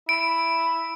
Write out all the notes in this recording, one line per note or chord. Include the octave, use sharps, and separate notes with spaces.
E4 D7